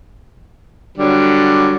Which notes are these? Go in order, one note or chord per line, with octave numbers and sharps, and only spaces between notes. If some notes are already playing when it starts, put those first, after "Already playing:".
D3 F#3 G3